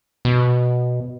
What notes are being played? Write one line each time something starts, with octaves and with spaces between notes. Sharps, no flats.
B2